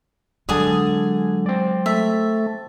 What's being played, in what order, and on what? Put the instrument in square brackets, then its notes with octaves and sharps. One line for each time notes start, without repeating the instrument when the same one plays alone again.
[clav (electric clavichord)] D3 A5 [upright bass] F#3 G#3 [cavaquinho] G#4 G#5 D#6
[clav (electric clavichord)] C4 D5
[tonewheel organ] A3 [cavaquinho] E5